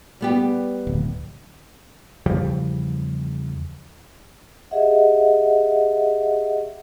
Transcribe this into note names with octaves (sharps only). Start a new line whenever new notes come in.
G3 B3 G4
D1
E2 C#3 F3 G3
G4 G#4 D#5 E5 F#5